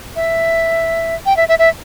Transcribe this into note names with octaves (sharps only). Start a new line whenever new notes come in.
E5
G5
E5
E5
E5